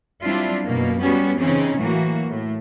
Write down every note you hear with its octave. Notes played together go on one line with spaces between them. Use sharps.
F#3 G3 C4 D4 E4 F4
F#2 B2 A#3
G3 B3 C#4 F#4 G4
C#3 E3 C4 C#4 D#4
A2 E3 F#3 A#3 F#4
A2